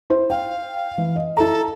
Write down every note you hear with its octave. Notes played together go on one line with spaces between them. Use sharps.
E4 C5
F5 G5
E3
D#5
E4 A4 A#5